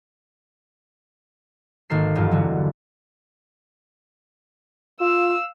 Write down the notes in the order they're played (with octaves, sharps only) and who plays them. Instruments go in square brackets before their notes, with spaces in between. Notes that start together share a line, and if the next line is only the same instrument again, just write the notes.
[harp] G#1 D#3 A#3 A4 C7
E1 G2 F#3 F4
D3 E3 F#3 G3
[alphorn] F4 [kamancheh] F5 E6